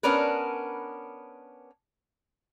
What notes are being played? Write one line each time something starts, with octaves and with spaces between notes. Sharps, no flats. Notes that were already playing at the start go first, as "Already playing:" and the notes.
B3 C#4 D4 A#4 B4